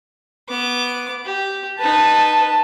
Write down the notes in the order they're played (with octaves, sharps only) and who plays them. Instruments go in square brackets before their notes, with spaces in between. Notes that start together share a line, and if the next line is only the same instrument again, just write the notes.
[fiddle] B3 D6
G4
[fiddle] D#4 B4 [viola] A5